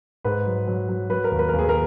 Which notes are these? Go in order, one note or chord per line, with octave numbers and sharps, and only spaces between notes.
G#2 B4
F#3
F#3
F#3
F#3 B4
A#4
D#2
B4
D#2 A#4
G#4
A#4